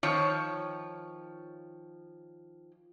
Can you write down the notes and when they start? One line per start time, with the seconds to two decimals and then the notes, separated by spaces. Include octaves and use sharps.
0.03 D#3 F3 C#5